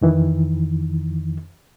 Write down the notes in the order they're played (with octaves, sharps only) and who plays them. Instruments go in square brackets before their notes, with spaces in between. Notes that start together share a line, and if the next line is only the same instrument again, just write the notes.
[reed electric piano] F2 D#3 E3